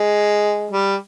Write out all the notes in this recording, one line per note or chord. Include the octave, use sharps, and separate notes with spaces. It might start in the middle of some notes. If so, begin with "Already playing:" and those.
Already playing: G#3
G3